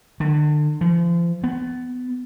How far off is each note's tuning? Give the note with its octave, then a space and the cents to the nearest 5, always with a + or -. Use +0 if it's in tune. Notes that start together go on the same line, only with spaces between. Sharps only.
D3 +35
F3 -35
B3 +20